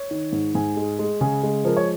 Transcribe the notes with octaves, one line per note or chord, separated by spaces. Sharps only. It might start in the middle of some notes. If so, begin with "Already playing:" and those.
Already playing: C#5
D#3
G#2
G#2 G#5
G#3
G#3
C#3 G#5
G#3
F3 A#4
C#5